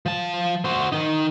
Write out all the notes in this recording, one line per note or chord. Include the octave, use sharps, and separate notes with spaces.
F3 A5
F#4 C5
D#3 D#4